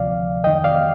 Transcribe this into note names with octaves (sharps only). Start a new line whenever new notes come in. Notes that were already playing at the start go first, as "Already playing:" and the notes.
Already playing: D2 C3 F3 D5 F5
F2 D#3 D#5 G5
D5 F5